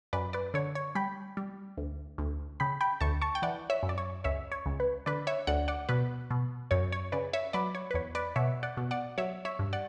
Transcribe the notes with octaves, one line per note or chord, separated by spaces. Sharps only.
F#2 B4 D5
B4 D5
D3 C#5
C#5
G3 G5 B5
G3
D2
D2
C#3 G5 B5
G5 B5
D2 A5 C#6
A5 C#6
G5
E3 D5 F#5
C#5 E5
F#2
D5
C#5
C#2 C#5 E5
C#5
C#2
B4
D3 B4 D5
C#5 E5
D2 D5 F#5
D5 F#5
B2 B4
B2
F#2 C#5
C#5
C#3 B4 D5
C#5 E5
F#3 B4 D5
C#5
B4
E2 C#5
B4 D5
B2 C#5 E5
D5 F#5
B2
D5 F#5
F#3 C#5 E5
C#5 E5
G2
D5 F#5